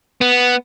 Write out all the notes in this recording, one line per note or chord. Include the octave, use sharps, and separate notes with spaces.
B3